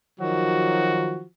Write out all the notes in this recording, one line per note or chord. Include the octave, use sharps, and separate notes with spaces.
D#3 F3 F#3 F#4